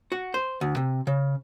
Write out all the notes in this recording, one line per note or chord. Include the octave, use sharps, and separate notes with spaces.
F#4
C5
D2
C3
C#3